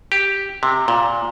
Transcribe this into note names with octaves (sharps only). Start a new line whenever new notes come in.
G4
C3
A#2